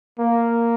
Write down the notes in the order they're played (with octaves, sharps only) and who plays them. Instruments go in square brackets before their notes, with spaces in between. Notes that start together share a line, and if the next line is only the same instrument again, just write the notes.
[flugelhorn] A#3